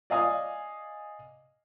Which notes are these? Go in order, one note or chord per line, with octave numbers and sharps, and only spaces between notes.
D5 D#5 F5 G#5 D#6